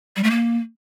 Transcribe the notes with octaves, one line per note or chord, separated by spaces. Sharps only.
G3
A3
A#3